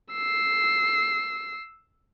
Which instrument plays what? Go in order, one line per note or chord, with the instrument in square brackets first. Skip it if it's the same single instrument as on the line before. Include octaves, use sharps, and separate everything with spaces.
[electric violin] E6 C7